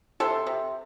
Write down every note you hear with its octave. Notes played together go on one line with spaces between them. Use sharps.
C3 A4 C5
C3